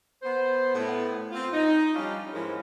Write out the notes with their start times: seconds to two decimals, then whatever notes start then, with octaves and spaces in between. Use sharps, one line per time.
0.23 B3 C5
0.75 A2 B3
1.32 C4 F4
1.53 D#4
1.94 F3 G3 C#4 D4 F4
2.34 G#2 E3 F3 G#3 C#4 A#4